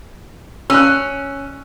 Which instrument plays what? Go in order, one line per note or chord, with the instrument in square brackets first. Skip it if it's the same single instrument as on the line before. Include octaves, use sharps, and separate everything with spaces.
[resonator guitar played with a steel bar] C#4 [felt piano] E6 F#6